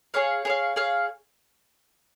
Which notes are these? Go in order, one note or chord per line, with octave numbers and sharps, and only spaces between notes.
G#4 C#5 F5
G#4 C#5 F5
G#4 C#5 F5